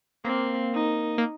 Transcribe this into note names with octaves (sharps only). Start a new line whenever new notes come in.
A#3 C4
D#4
A#3